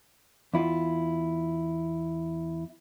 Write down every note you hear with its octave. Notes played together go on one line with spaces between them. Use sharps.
E2 E4 F4